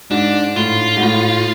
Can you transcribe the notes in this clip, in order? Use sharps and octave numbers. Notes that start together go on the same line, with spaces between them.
G#2 D4
A2 F4
G#2
A2